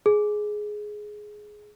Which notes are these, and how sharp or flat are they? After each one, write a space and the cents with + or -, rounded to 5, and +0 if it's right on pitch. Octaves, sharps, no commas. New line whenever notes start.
G#4 +10